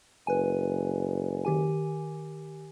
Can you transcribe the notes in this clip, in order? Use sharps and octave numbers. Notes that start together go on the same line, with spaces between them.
F#1 B4 G#5
D#3 G4 G#5